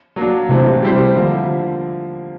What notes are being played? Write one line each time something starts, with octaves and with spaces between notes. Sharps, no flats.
F#3 A#3 D4
C3 E3 A3 C4
G3 C4 E4 G4 C5
D3 F3 A#3